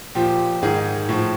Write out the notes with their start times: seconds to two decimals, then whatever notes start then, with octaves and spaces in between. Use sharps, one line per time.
0.15 A#2 F3 G4
0.63 G#2 D#3 G#4
1.09 A2 F3